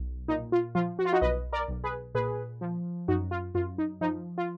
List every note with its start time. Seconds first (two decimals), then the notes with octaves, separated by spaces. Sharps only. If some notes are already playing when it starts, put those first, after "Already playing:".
Already playing: B1
0.28 A#2 D#4
0.52 F4
0.75 F3 F4
0.99 F#4
1.05 F4
1.13 D#4 F#4
1.21 B1 B4 D#5
1.53 A#4 D5
1.68 B1
1.84 G#4 B4
2.15 A#2 G#4 B4
2.61 F3
3.08 F#2 D#4 F#4
3.31 F4
3.55 F#2 F4
3.78 D#4
4.01 F3 D#4
4.38 F4